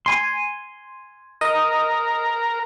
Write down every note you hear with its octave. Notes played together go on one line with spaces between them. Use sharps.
G#5 C6
A#4 D#5 D#6